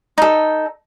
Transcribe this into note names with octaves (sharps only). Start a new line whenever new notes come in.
D#4 A4